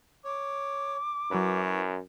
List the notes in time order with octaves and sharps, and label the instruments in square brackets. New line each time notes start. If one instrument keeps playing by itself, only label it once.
[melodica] C#5 [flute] D6
[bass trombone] F#2 [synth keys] F#3 E4 B4 [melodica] C#5